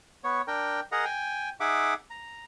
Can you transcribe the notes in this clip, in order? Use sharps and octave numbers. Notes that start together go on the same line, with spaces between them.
B3 C#5
D4 A#4 G5
G#4 A#4 D#5 F#5 A#5
G5 G#5
D#4 G#4 E5 F#5 D6
A#5